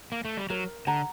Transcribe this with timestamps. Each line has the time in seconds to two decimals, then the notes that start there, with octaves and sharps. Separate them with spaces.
0.12 A#3
0.25 A3
0.37 G3
0.50 F#3 A#4
0.87 D3 F#5 A#5